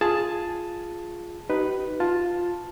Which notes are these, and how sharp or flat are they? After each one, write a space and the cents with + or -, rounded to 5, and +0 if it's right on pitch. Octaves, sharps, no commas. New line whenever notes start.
F4 +0 G#4 +0 A5 +0
D#4 +0 G4 -40 B4 +0
F4 +10 A5 +0